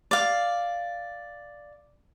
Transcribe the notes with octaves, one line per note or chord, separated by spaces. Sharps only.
D5 F5